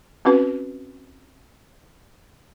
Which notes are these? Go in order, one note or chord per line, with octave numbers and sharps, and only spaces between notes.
C4 C#4 F#4 B4